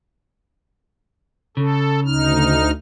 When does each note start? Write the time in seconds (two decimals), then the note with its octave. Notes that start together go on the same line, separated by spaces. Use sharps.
1.57 C#3 A4
2.06 D2 D#4 F6